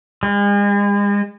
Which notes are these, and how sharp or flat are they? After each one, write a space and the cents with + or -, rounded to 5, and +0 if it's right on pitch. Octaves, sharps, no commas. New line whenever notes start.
G#3 -40